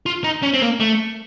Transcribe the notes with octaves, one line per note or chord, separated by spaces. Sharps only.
F4
D#4
C#4
C4
A#3
A3